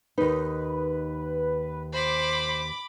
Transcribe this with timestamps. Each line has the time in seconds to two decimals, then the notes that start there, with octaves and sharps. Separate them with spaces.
0.18 D#2 D#4 B4
1.94 C5 B5 D6